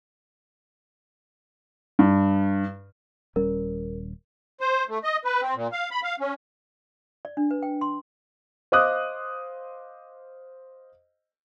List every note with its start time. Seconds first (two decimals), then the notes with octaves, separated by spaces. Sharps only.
1.99 G2
3.36 D#1 G3 C#4 A#4
4.61 C5
4.89 A3
5.04 D#5
5.25 B4
5.41 C4
5.55 A#2
5.72 F5
5.91 B5
6.03 F5
6.20 C#4
7.25 D5
7.37 D4
7.51 B4
7.63 G5
7.81 C6
8.72 C5 D#5 F5 D6 D#6 F#6